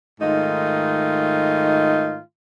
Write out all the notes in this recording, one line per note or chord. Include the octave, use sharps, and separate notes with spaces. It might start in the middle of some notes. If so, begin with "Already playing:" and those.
G#2 D#3 A3 D#4 F4